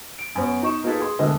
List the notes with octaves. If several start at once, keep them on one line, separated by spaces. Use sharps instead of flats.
D7
F#2 B3 C#4
D#4 C#6 E7
A#3 D#4 F4 G#4 A4 B4
G#4 C6
E1 D2 D3 D4 A#4 D#5